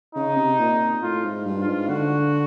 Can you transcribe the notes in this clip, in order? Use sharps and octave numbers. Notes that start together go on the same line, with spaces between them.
C#3 D#4
C3
A#2
A2 F4
G#2
G2
F4
G#2
D3 F#4